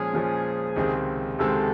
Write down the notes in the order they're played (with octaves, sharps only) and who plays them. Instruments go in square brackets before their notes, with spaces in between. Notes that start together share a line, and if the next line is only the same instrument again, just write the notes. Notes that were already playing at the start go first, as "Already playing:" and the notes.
Already playing: [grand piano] A#2 F3 G#3 C#4 [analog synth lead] G#4
[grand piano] A#2 F3 G#3 C#4
C#2 C3 D#3 G#3 C4
[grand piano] C#2 C3 D#3 G#3 C4 [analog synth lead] A4